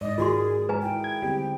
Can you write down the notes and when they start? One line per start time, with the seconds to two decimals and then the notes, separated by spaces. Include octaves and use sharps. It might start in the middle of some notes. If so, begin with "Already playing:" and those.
0.01 G#2 D#4 D5 D#5
0.18 D#3 G#3 F4 F#4 G#4 A#4 C6
0.69 G#3 B4 G#5 A#5
0.82 E4 G#4 G5
1.04 G#6
1.22 D3 G3 B3 C4